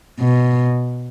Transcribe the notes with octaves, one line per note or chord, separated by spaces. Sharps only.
B2